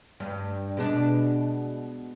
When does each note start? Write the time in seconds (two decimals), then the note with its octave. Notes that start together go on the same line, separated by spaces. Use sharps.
0.20 G2
0.77 B2 G#3 D4